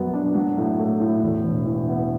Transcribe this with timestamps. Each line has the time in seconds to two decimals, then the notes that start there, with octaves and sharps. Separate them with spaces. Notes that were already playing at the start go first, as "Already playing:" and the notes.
Already playing: F#2 F#3 B3
0.13 D4
0.34 F#3
0.57 A2
0.79 A3
1.00 A2
1.22 E2
1.43 E1
1.66 E3
1.88 B3